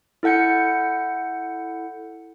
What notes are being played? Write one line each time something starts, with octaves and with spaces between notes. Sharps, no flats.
E4 A4 F#5 G6 C#7